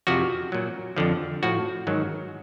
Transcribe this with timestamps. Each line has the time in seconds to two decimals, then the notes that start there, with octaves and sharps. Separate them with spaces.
0.07 F2 C3 F3 F#4
0.52 A#2 F#3
0.96 F2 D3 F3
1.43 A2 F3 F#4
1.87 G#2 D#3 F#3